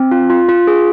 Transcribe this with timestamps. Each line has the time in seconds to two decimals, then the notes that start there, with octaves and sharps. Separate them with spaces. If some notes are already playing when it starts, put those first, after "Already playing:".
Already playing: C4
0.11 F4
0.30 F4
0.49 F4
0.67 G#4